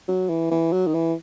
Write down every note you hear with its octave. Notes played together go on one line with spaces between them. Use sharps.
F#3
E3
E3
F#3
D#3
E3